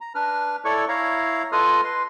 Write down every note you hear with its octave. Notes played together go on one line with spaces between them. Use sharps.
A#5
D4 B4 F6
E4 A4 C#5 D5 C#6
E4 C#5 F5 A#5
F4 A4 B4 D#5 D#6 F6
B4 C6